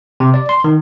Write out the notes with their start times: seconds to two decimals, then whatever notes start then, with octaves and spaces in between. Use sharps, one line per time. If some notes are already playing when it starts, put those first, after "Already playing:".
0.20 C3
0.34 D5
0.49 C6
0.64 D#3